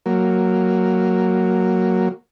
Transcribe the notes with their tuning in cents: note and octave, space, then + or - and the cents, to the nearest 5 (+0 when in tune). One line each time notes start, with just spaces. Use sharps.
F#3 +0 A#3 -10